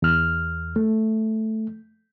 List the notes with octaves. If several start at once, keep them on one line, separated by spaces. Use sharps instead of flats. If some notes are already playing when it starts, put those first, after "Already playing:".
E2 F6
A3